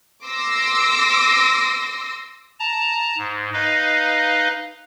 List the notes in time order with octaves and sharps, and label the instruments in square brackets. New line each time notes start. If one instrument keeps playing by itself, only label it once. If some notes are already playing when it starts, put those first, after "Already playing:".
[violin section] C6 D6 E6 A#6
[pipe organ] A5 A#5
G#2
D#4 B4 D#5 F5